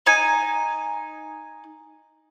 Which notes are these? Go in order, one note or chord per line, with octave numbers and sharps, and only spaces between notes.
D#4 G#5